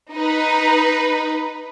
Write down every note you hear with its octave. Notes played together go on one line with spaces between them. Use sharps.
D#4 B4